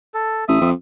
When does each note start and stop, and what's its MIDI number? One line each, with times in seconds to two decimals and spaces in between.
0.14 0.45 69
0.48 0.59 33
0.48 0.70 76
0.48 0.70 87
0.61 0.72 41